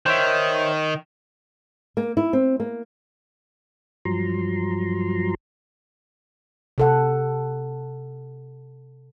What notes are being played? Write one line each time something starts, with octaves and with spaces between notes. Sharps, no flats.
D#3 C5 C#5 E5
A#3
E4
C4
A#3
G2 F3 F#3 A#5 C6
C3 A4 F#5